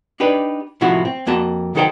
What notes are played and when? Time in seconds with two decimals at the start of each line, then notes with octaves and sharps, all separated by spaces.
0.20 D4 D#4 G4 B4
0.81 A2 C3 F3 E4 F#4
1.05 C4
1.27 F2 A#3 F#4 A5
1.75 D#3 F#3 D#4 A4 C5 G5